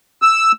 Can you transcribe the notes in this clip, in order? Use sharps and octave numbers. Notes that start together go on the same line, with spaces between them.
E6